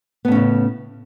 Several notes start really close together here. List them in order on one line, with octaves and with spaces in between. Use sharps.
B3 A2 C#4 C#3